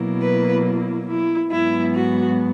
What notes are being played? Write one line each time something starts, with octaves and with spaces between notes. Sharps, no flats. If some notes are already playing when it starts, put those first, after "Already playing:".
Already playing: B2 F#3 A#3 E4
B4
E4
G#2 F#3 B3 E4
F#4